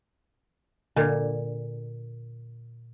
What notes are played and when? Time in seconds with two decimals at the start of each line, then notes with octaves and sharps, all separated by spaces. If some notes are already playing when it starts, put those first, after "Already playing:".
0.96 A#2 D3